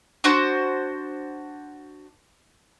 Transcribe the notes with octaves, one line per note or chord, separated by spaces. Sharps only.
D4 F#4 C5